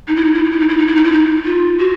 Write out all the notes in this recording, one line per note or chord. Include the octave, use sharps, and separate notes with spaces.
D#4
E4
D#4
E4
D#4
E4
D#4
E4
D#4
E4
D#4
E4
D#4
F4
F#4